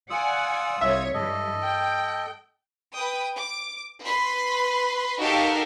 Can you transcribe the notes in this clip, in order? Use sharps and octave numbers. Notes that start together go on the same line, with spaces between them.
F4 D5 F#5 G#5 D#6 E6
C2 C#5 E5 G#6
G2 E3 A4 D#5
G5
B4 G5 D#6
D6
B4 B5 C6
D#4 F#4 G4 A4 A#4 F5